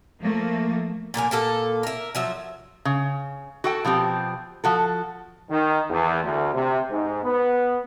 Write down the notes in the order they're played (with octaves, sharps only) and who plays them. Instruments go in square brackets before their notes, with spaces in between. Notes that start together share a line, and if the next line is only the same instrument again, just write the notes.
[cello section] F3 A3 A#3
[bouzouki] A#2 D3 A#4 G#5
A#2 A#3 A4
A#4 E5
F3 F#3 E5
[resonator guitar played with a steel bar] C#3
F#4 A4 G5
B2 F3 C4 G4
F3 F#4 A4
[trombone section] D#3
E2
D2
C3
G#2
B3